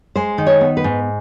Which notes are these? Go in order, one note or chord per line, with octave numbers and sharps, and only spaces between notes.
G#3 C5
D#3
C#5
B3
B4
G#2